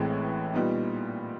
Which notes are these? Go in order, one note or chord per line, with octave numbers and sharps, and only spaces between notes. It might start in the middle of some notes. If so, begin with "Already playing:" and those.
Already playing: A1 A2 E3 G#3 C4
A#2 G3 B3 D#4